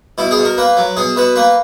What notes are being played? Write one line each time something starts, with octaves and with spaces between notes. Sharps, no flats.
B2 E4
G#4
B2
A#4
A#3 B4
F#3
B2 G#4
B2 B4
A#3 B4